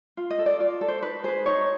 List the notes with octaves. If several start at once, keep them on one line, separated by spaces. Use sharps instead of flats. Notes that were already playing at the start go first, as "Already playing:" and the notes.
F4
D#5
A4
D5
F4 D5
A4
C5
D#4 B4
G#4 B4 C5
D#4 C#5